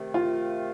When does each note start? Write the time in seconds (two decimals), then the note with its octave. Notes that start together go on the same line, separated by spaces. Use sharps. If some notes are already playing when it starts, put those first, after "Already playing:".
Already playing: C3 D#3 A3
0.14 F4